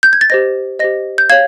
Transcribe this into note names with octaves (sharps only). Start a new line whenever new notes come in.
G6
G#6
A6
G4 C5 D#5 A#6
G4 C5 D#5 A#6
G6
C#5 F5 G#6